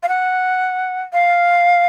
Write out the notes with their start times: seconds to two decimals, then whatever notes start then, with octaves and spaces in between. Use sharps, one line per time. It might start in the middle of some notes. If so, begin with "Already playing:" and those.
0.03 F5
0.09 F#5
1.13 F5